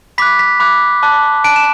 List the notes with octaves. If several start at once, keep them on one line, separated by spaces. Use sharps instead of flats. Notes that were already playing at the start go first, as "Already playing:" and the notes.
B5 D6 F#6 B6
B6
B5 D6 F#6
A5 D6 F#6
A5 F#6 D7
E7